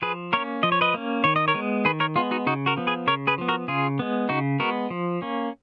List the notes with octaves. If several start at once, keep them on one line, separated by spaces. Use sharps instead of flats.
F3 G#4 B4
A#3 C#4 A#4 C#5
F3 D#5
C#5
B4 D#5
A#3 C#4
D#3 C#5
D#5
A#4 C#5
G#3 B3
D#3 G#4 B4
A#4 C#5
G#3 B3 F4
D#4 F#4
C#3 D#4 F#4
F#4 A#4
F3 B3
G#4 B4
C#3 A#4 C#5
G#4 B4
F3 B3
F#4 A#4
C#3 F4 G#4
G#3 B3
C#3 D#4 F#4
G#3 B3 F#4 A#4
F3
A#3 C#4